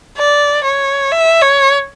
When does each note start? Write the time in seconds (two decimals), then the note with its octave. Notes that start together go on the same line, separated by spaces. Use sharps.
0.17 D5
0.64 C#5
1.12 E5
1.42 C#5